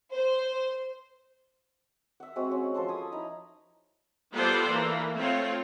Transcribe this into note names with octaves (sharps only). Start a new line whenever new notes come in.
C5
E5 F#5
G#3 C4 F#4
C#4
F3 A4 C5 C6
G#5 B5 D#6
D#4 E4 A#5
G3 B3 F4 A4 C5 D5
E3 A#3
A3 C4 F4 C#5